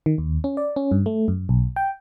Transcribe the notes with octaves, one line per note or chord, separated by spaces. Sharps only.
D#3
D#2
C#4
D5
C#4
G2
A3
F#2
B1
G5